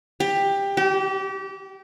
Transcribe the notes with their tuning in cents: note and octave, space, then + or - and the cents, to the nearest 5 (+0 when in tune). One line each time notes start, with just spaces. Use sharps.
G4 +15
G4 -30